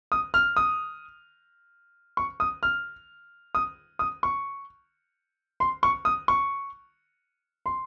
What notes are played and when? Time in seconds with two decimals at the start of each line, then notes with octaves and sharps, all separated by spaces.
0.12 D#6
0.34 F6
0.57 D#6
2.17 C#6
2.40 D#6
2.63 F6
3.55 D#6
3.99 D#6
4.23 C#6
5.60 C6
5.83 C#6
6.05 D#6
6.28 C#6
7.66 C6